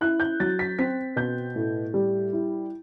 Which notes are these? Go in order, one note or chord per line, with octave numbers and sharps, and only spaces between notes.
E4 F#6
G6
F#3 A6
B6
C4 B6
B2 G6
A2
G3
E4